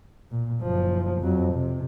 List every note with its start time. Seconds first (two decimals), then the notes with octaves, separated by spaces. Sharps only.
0.31 A#2
0.62 F#1 F3
1.21 F2 F#3
1.53 C3